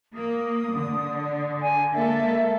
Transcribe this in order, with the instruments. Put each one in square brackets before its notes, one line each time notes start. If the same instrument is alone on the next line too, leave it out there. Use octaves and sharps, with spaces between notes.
[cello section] A#3 [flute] D#6
[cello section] D3
[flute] G#5
[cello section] G#3 A#3 A4 [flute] E5